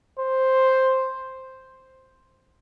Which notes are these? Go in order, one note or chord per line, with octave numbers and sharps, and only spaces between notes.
C5